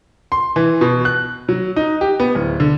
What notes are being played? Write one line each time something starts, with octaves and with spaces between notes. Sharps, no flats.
C6
E3
B2
F#6
F#3
D#4
G4
B3
D1
D3